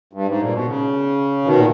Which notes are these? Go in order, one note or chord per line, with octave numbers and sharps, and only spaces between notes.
G2
G#2
A#2
B2
C#3
B2 D#3
A#2